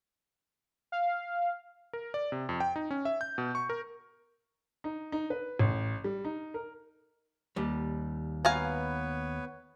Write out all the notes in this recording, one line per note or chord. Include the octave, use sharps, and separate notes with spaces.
F5
A#4
D5
C3
F2
G5
D#4
C#4
E5
G6
B2
C#6
A#4
D#4
D#4
B4
A1
G3
D#4
A#4
D#2 G3
B3 B4 C#5 F5 G#5 A#5